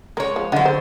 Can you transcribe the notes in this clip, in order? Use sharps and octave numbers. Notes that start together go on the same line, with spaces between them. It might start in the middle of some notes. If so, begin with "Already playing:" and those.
G#3 A#4 C#5
F3
D3 D#3 F3 F#3 F#5
C5